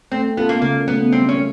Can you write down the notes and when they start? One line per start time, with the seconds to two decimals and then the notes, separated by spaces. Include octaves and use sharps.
0.12 A3 C4
0.37 B3 C#4 F4 A4
0.49 A#3
0.62 C#3 A#3
0.88 F#3 A3 B3
1.12 G3 C4
1.29 C#4
1.37 A#3